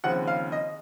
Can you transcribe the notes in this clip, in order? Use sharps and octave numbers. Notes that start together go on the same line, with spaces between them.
D#2 C#3 F3 C4 F#5
F5
D#5